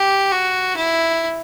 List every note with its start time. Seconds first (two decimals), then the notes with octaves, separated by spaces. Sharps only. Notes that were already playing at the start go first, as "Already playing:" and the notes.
Already playing: G4
0.31 F#4
0.77 E4